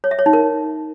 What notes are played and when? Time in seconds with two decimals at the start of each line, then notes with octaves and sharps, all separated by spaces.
0.04 C#5
0.11 E5
0.19 C#5
0.26 D#4
0.33 A#4